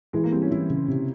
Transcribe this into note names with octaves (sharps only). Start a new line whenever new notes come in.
E3 G#3
A#3
G3 C4
C#4
E3 E4
C#3
C3